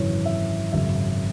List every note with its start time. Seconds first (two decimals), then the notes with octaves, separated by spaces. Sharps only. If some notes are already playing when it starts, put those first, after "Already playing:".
Already playing: G#1 F#2 C#3 E3 C#5
0.26 E5
0.72 G#1 F#2 C#3 E5